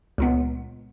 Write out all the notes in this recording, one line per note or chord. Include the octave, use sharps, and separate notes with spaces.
C#2 A#2 B3